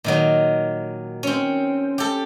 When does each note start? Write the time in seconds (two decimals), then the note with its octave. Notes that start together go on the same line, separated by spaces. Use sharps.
0.04 A#2 D#3 F#3
1.23 C4 C#4
1.98 G4 A4